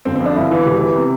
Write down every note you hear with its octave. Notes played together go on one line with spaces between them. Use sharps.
G1 C4
C4
F2
D4
G1 E4
E3
E1 G4
E3
C3